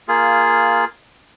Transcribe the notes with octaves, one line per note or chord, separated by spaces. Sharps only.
A#3 F4 G#4